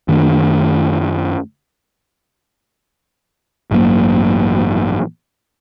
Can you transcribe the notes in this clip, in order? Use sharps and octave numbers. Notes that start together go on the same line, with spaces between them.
F#2 D#3 A3 D4
A1 G2 F#3 A#3